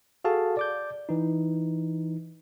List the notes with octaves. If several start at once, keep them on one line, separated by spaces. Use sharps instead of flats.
F#4 G#4 A4 F5 A5
D5 D6 G6
E3 D#4